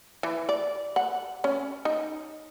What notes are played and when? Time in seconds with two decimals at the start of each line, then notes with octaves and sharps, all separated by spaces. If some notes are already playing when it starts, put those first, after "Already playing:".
0.23 E3
0.49 D5
0.96 F#5
1.44 C#4
1.85 D#4